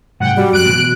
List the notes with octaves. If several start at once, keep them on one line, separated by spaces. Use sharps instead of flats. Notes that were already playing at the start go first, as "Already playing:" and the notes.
G#2 C3 F#3 F#5 G5
G3 F#4
F#2 F3 F#6 D7
B2 E3 A3